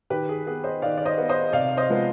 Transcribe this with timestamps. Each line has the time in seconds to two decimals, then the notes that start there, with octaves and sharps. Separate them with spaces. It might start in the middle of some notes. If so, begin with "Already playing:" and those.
0.10 D#3 G4 B4
0.29 G#4
0.47 B3 G#4
0.64 C5 D#5
0.82 D#3 D5 F5
0.98 D5
1.05 C5 D#5
1.18 B3
1.29 C5 D#5
1.53 C3 D5 F5
1.77 C5 D#5
1.90 F3 G#3 B3